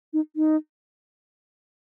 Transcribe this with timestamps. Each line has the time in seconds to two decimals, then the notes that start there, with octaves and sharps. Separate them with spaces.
0.13 D#4
0.36 D#4